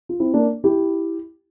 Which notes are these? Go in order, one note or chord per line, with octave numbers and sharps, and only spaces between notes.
F4
C4 E4
A#3 D4
E4 G4